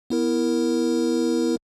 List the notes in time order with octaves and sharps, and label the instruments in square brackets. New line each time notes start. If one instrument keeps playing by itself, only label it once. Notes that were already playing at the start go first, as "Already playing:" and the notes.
[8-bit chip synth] B3 E4 A#4